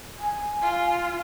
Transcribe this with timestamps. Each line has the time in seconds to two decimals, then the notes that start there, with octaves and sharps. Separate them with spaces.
0.19 G#5
0.62 F4